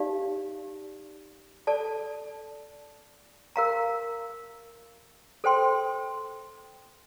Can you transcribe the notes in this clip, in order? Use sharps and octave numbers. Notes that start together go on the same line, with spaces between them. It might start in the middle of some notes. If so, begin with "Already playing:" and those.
Already playing: D#4 G4 D5 F5
A4 D5 A5
A#4 F5 A#5
A4 C5 G5 C6